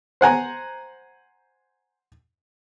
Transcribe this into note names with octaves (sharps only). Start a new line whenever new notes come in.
C5 F#5 G#5 A#5